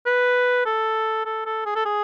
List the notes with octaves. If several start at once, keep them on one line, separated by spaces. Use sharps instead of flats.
B4
A4
A4
A4
G#4
A4
G#4